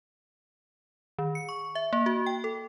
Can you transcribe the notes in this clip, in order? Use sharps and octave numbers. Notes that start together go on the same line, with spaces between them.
D#3
C#7
C#6
E5
A#3
F#4
G5
A4